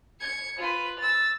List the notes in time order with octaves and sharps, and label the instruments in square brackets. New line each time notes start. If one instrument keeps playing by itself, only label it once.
[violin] G#6 C#7
F4 B4
E6 A6